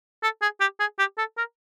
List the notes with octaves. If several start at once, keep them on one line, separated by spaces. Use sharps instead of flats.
A4
G#4
G4
G#4
G4
A4
A#4